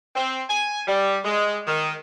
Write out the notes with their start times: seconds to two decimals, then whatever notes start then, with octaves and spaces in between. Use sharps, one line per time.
0.16 C4
0.48 G#5
0.88 G3
1.24 G#3
1.67 D#3